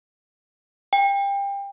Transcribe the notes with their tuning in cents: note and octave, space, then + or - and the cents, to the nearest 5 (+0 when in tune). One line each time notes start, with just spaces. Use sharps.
G5 +25